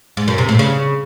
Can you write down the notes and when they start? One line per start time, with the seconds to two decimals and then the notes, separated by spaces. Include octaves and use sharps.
0.17 G#2
0.28 F#2
0.38 C3
0.49 A2
0.59 C#3